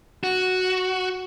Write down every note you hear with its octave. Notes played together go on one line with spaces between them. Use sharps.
F#4